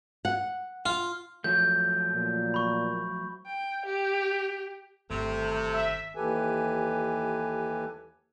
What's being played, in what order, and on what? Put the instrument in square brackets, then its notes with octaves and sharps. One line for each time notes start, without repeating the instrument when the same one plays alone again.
[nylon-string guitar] F#5
[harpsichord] F4
[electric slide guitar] F3 F#3 A3 [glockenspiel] G6
[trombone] A#2
[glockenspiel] B5 C#6
[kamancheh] G5
G4
[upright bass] G1 D#3 [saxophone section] C3 [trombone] A3
[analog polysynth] E5
[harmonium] D#2 E3 G4 A4 B4 G#5